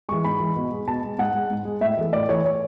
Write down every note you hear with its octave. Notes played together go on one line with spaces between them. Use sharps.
E3 G#3 C#6
G#2 B5
E3 G#3
B2
G#3
B2 A5
G#3
G#2 F#5
G#3
G#2
G#3
A2 E5
E3 A3
A2 D5
E3 A3 C#5
C#5